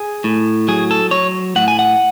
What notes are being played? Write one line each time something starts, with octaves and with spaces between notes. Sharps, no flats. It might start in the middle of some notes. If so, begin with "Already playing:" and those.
Already playing: G#4
A2
F#3 G#4
A4
F#3 C#5
A2 F#5
G#5
F#5